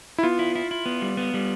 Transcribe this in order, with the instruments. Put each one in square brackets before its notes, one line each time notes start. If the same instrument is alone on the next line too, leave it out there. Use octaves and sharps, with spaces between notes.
[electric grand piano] E4
[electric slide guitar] B3 [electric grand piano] F4
[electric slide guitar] E4
E4
E4
B3
G3
B3
G3